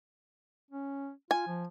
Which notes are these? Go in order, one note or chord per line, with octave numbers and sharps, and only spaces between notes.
C#4
F4 G#5
F3